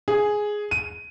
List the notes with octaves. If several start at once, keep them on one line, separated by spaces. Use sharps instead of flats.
G#4
D#7